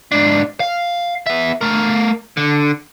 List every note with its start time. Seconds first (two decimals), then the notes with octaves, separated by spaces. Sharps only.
0.12 G#2 D4
0.60 F5
1.27 B3 E5
1.61 A3 A#4
2.37 D3